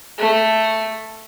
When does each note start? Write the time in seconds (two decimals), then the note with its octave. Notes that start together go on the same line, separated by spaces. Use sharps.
0.18 A3